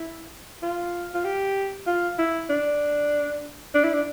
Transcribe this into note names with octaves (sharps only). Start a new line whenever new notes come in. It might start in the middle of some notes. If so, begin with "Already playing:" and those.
Already playing: E4
F4
F4
G4
F4
E4
D4
D4
E4
D4